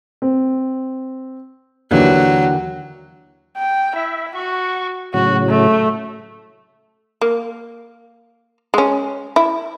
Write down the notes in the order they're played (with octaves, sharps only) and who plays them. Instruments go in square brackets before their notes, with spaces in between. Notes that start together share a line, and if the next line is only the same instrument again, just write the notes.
[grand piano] C4
[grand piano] D#2 D3 E3 [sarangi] F#3
[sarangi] G5
[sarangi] E4 [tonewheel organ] E5
[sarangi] F#4 [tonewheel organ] C#6
[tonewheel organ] A2 C#3 F#3 [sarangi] F#4
[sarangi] A3
[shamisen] A#3
G#3 C#4
E4